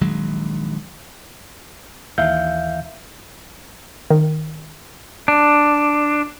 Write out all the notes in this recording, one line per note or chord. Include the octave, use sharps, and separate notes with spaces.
A#1 D#3 F#3 G#3
D#2 E3 E5 F5 G6
D#3
D4